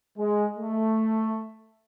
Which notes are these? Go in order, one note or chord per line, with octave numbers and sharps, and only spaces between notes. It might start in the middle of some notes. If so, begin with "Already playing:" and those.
G#3
A3